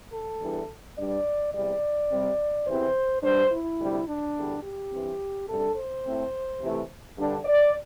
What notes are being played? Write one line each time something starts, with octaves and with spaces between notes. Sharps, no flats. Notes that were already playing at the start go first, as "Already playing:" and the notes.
A4
E2 E3 G3 D4
G2 G3 D4 D5
E2 C3 G3 D5
C3 G3 C4
E2 C3 E3 C4 C5
G2 G3 D4 C5
E4
D2 C3 G3
D4
E2 D3 G3
G4
G2 E3 C4
C3 G3 D4 A4
C5
A2 A3 C4
C3 E3 A3
G2 D3 G3 D4
D5